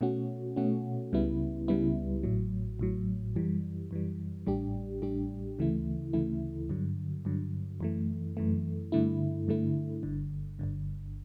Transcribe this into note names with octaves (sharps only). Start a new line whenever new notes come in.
B2 A3 C#4 F#4
B2 A3 C#4 F#4
C#2 C#3 G3 B3 E4
C#2 C#3 G3 B3 E4
A1 A2 F#3
A1 A2 F#3
F#2 E3 G3
F#2 E3 G3
A1 A2 G3 D4 G4
A1 A2 G3 D4 G4
D2 C#3 E3 A3 E4
D2 C#3 E3 A3 E4
G2 D3 F#3
G2 D3 F#3
F#2 E3 A3
F#2 E3 A3
G2 D3 A3 E4
G2 D3 A3 E4
G1 G2 D3
G1 G2 D3